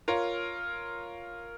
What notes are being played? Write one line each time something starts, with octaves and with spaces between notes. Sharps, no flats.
F4 A#4 C#5